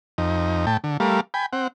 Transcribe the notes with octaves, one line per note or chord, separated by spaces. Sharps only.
F2 D#4
A2 G5 A5
D3
G3 A3 A#4 F5
G5 G#5 B5
C4 F#5